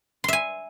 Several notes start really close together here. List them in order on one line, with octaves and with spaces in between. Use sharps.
C6 E5 G#5